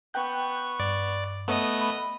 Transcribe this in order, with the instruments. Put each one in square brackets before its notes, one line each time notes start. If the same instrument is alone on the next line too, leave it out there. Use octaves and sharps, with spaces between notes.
[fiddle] B3 C#6 [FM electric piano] G5 F#6 G6
[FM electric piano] G2 [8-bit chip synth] D5
[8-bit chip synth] A3 B3 [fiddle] D#5
[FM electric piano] B5